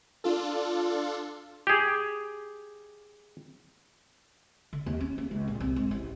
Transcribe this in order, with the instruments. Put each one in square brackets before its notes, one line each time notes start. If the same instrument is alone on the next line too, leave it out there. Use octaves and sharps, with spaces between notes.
[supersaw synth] D4 F4 A4
[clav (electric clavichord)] G4 G#4
[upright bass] D3
D#2
C#4
A#3
C#2
A#2
C2
G#2
A1